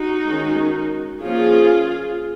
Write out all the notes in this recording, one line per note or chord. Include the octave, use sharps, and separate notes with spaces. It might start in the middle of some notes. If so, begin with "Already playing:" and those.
Already playing: D#4 F#4
D#3 G#3 C#4
F3 A#3 C#4 F4 G#4